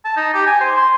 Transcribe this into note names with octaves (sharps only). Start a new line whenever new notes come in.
A5
D#4
G4
G#5
C5
C6